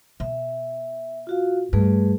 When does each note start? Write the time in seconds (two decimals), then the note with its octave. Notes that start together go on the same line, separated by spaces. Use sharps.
0.20 B2 E5
1.27 F4 F#4 F5
1.73 G2 A3 G#4 B4